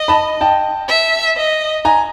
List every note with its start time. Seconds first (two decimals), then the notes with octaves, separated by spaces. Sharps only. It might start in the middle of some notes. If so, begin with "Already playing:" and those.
Already playing: D#5
0.08 A5 B5
0.41 G5 A5
0.88 E5
1.37 D#5
1.85 G#5 A#5